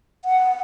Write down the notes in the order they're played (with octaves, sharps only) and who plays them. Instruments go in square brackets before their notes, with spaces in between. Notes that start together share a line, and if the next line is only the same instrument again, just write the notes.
[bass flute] F#5